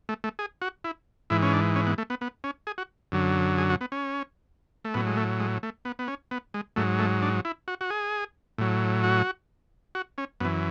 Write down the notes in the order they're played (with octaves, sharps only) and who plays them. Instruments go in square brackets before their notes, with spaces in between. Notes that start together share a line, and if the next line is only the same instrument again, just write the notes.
[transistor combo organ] A3
A3
G#4
F#4
E4
G#2 E3 E4
C#4
D4
C#4
B3
A3
B3
B3
C#4
G#4
F#4
F#2 D3 F#3
G#4
F#4
B3
C#4
A3
A2 F#3 B3
G#3
A3
G#3
A3
B3
B3
C#4
B3
G#3
G#2 F#3 A3
A3
D4
E4
F#4
F#4
G#4
A2 F#3
F#4
F#4
C#4
F#2 B3
E3